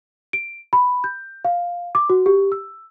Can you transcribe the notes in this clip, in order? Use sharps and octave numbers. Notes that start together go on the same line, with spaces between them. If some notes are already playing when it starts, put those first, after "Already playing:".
D7
B5
G6
F5
D6
F#4
G4
E6